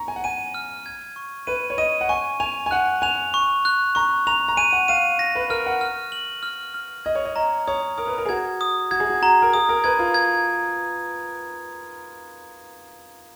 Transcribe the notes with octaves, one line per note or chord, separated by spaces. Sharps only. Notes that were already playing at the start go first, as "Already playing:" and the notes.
Already playing: A#5 C#6
G#5
F#5
G#5 D#7
F6
G#6
C#6
B4 D#7
C#5
D#5 D#7
F#5
G#5 C#6
G#5 F7
G#5
F#5 F#6
G#5 F7
C#6
F#6
A#5 C#6
A#5 F7
A#5
G#5 D#7
F#5
F5 D#7
A#6
B4
A#4 F6
F#5
F6
F#7
F6
F6
D#5 G#6
C#5
D#5
D#5 A#5
C#5 D#6
A#4 D#6
B4
A#4
G#4
F#4 G#6
D#6
F#4 G#6
G#4
F#4
F#4 A#5
A#4
G#4 D#6
A#4
B4 G#6
F4
G#6